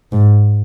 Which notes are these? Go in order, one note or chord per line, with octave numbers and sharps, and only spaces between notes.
G#2